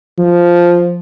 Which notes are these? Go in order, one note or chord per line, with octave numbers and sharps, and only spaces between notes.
F3